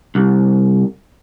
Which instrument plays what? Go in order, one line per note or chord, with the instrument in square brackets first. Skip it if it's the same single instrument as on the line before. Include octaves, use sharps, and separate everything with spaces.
[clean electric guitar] C2